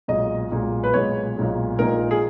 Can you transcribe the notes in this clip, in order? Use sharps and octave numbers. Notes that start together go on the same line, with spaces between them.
B1 A#2 G#3 D#5
B1 A#2 G#3
B4
B1 A#2 G#3 C#5
B1 A#2 G#3
A#1 A#2 G#3 D#4 A#4
G#4